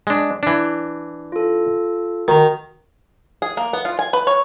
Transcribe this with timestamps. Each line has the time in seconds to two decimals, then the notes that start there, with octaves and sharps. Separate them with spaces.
0.07 G#3 D4
0.43 E3 D4
1.32 F4 A4
2.28 D#3 F#4 A#5
3.42 G#4
3.57 A#3
3.73 B3
3.85 F4
3.99 G#5
4.13 B4
4.27 C#5